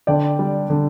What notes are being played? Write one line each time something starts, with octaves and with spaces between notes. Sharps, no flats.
D3 D5 G5
G3
D3